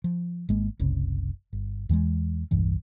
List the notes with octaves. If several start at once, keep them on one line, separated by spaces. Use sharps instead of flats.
F3
G#1 G#3 A#3
F#1 C2 C#3
G1
E2 E3 G3 G#3
E1 C2 G2 E3